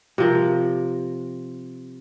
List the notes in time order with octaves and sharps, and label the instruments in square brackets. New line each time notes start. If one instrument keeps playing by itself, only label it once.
[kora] C3 F3 A#4